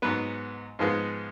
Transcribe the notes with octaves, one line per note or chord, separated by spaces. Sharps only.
G#2 F#3 B3 B4
G#2 F3 G#3 B3